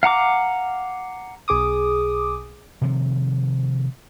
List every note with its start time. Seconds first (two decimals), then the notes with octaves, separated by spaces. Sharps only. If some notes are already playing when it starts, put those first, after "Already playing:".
0.03 F5 F#5 A#5 D6
1.48 B1 G#4 D6 D#6
2.81 C3 D#3 F3